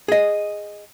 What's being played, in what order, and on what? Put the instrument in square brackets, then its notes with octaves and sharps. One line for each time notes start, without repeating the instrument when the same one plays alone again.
[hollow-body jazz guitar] G#4 D#5